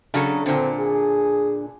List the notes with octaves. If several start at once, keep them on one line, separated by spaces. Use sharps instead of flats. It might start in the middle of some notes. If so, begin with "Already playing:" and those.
C#3 F#3 D4 A4
A#2 D3 C4
G#4